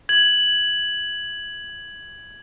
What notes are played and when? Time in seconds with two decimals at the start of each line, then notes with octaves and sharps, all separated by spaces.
0.09 G#6 F#7